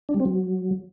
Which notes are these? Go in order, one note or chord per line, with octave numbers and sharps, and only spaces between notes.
D4
G3
C4
F#3